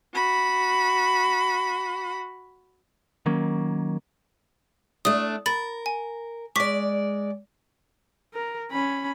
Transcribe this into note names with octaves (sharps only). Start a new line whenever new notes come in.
F#4 B5
D#3 F#3 A#3 C#4
A3 D4 D#6
A#4 B5 A6
G#5
G#3 D5 C#6 D6 B6
A#4
C#4 B5